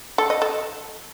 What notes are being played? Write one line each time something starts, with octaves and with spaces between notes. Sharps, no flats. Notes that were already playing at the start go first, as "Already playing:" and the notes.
A4
D#5
A4